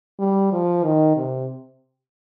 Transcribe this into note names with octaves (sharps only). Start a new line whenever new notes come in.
G3
F3
D#3
C3